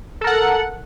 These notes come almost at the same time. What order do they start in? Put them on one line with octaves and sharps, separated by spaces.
A4 A#4 F#5